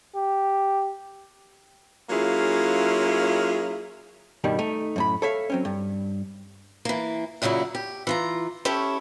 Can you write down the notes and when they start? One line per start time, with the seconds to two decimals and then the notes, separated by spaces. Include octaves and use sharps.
0.16 G4
2.10 F#3 A#3 C#4 E4 F4 G#4
4.44 G2 B2 D#3 G3
4.59 A3 D#4
4.96 F#2 A2 B5
5.22 A4 C#5 E5 F5
5.50 F#3 C4 C#4
5.65 G2
6.85 E3 A#3
7.42 F#2 A#2 C#3 F#3 E4
7.75 G4
8.07 E3 F4 A#5
8.65 C#4 E4 G4 A4 C#5